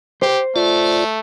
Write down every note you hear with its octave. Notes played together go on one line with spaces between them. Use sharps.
G4 C5
A3 F4 D5